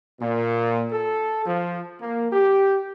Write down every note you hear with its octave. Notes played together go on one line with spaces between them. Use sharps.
A#2
A4
F3
A#3
G4